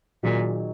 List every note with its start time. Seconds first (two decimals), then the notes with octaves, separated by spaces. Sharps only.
0.23 A#2 D#3 F#3 A#3 D#4 G#4